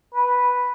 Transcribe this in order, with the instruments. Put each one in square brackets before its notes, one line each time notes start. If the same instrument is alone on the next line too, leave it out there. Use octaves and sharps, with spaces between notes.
[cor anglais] B4